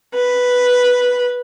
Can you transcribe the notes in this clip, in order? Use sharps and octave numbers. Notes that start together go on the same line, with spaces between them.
B4